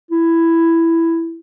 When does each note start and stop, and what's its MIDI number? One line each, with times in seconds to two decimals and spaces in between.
0.11 1.40 64